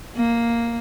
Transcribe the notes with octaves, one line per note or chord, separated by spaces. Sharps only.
A#3